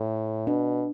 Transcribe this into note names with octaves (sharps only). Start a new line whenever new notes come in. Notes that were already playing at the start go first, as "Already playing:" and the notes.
Already playing: A2
B2 D4